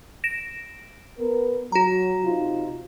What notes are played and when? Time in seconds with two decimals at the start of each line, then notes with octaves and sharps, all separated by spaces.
0.24 A#6 D7 E7
1.19 B3 A#4
1.72 F#3 F#4 A#5
2.25 C3 D#4 F4